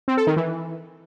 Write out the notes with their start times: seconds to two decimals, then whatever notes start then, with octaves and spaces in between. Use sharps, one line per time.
0.08 C4
0.17 A4
0.27 D#3
0.37 E3